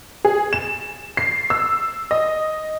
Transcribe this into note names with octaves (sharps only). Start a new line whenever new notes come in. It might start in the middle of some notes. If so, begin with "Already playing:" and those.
G#4
E7
C7
E6
D#5